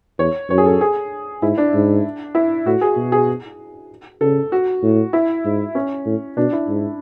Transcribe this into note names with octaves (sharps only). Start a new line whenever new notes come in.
E2 C#5
F#2 C#5
G#4
A4
G#4
G#2 E4
D4
G#2
E4
A2 F#4
G#4
B2
G#4
C#3 A4
F#4
A2
E4
G#2
C#4
A2
B2 D4
E4
G#2